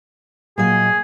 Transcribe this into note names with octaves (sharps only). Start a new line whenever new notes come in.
A#2 F#3 G#4 D#5